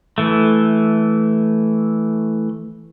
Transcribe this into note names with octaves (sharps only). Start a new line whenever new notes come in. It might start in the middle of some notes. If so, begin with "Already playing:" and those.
E3 A3